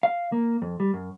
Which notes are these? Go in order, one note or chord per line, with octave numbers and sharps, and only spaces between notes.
F5
A#3
F2
G3
F#2